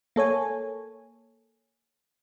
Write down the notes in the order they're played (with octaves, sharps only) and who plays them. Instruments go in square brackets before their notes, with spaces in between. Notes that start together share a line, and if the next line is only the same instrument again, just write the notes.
[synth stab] A#3 A4 C#5 G#5